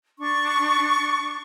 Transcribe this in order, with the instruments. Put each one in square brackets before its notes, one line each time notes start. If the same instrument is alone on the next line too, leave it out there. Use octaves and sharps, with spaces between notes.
[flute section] D4 C#6